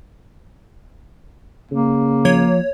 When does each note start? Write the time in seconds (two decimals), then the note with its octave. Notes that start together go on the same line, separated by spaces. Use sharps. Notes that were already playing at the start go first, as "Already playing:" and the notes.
1.72 C#3 A#3
2.25 F3 C#5